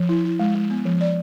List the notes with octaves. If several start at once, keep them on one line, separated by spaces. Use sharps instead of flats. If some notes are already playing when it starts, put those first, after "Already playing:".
Already playing: F3
E4
E4
G#3
G#3
B3
F3
D5